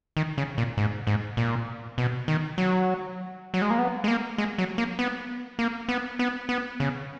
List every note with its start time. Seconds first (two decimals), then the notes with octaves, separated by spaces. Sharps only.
0.17 D#3
0.38 C#3
0.58 A#2
0.77 G#2
1.07 G#2
1.37 A#2
1.98 B2
2.28 D#3
2.58 F#3
3.54 F#3
3.62 G#3
3.70 A#3
3.79 B3
4.04 G#3
4.08 A#3
4.38 G#3
4.58 F#3
4.78 A#3
4.99 B3
5.59 A#3
5.89 B3
6.19 B3
6.49 B3
6.80 C#3